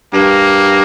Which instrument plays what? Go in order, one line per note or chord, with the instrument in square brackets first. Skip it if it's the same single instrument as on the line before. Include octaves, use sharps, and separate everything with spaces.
[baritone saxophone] G2 [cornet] A#3